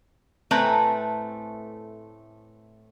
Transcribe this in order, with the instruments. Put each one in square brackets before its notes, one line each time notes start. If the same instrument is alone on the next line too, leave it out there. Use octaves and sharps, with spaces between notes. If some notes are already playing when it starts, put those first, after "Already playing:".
[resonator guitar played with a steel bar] A2 A3 C4 B4 G#5 A#5